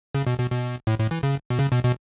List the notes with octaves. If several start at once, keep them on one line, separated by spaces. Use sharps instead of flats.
C#3
B2
B2
B2
A2
A2
E3
C#3
B2
C#3
B2
B2